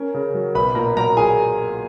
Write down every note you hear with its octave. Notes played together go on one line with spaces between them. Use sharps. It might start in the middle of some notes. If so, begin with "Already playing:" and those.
Already playing: C#4 A#4
C#3
F#3
B1 B4 B5
A#2 A#4 A#5
F#3 A#4 A#5
F4 G#4 G#5